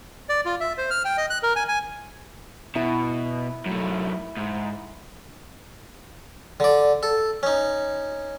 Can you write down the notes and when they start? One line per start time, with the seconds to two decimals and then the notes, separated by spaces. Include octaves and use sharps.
0.29 D5
0.45 F4
0.60 E5
0.78 C5
0.90 F6
1.05 G5
1.18 D#5
1.30 F#6
1.43 A#4
1.56 G#5
1.68 G#5
2.76 B2 E4 B5
3.66 F#2 A3
4.37 G#2
6.60 D3 D5
7.03 A4
7.43 C#4 D#4